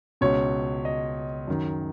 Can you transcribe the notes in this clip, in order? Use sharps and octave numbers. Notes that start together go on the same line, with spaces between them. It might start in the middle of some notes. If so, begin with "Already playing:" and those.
C#2 B2 C#5
D#5
F#2 D#3